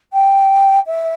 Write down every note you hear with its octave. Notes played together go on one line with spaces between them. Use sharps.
G5
E5